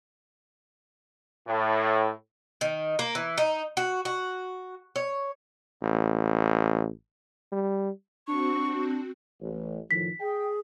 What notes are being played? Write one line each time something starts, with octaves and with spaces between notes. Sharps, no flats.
A2
D#3
A#3
E3
D#4
F#4
F#4
C#5
A1
G3
C4 D4 F#4 C#6
A1
A2 D#3 F3 B6
G#4 G5